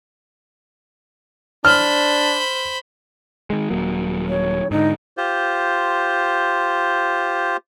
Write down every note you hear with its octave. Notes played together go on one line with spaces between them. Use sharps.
D4 C5 B5 F6
D#3 G#3
D#1 F#3 A#3
C#5
G#2 D3 D#4
F4 G4 C5